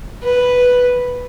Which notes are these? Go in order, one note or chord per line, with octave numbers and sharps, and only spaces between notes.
B4